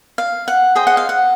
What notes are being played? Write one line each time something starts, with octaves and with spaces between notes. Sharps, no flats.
F5
F#5
G#4 C5 D#5 G5
F#5
F5
F#5